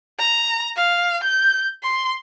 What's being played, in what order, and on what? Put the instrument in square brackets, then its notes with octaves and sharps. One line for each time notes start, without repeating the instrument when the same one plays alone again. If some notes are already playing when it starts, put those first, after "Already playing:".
[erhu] A#5
F5
G6
C6